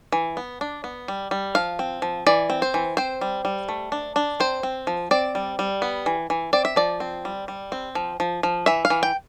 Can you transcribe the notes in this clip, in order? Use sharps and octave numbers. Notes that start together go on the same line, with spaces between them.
E3
B3
D4
B3
G3
G3
F3 F5
C4
F3
E3 D5
C4
C5
E3
C4 C5
G3
G3
A3
D4
D4
C4 C5
C4
F3
C4 D5
G3
G3
B3
E3
E3
C4 D5
E5
F3 D5
C4
G3
G3
C4
F3
F3
F3
E3 E5
F5
E3
G5